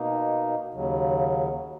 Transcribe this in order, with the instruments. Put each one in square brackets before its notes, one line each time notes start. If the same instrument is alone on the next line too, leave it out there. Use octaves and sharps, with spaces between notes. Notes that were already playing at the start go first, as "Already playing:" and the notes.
Already playing: [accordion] B2 A#3 D#4
D#2 C#3 F#3